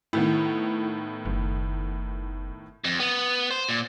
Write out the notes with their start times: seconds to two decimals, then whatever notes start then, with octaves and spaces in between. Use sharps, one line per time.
0.13 A2 D#3 B3 E4
1.25 F#1
2.84 F2
3.00 B3
3.51 C5
3.69 A#2